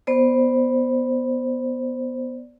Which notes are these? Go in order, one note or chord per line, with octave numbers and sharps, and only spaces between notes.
B3 C5 D5